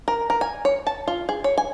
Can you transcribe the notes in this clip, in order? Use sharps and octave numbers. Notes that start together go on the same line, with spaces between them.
A#4
A#4
G#5
C#5
A5
F4
G#4
C#5
G#5